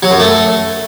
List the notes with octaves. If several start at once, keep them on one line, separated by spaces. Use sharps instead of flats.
F#3
F#2
A3